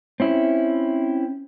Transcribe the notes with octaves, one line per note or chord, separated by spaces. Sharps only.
C4 C#4 E4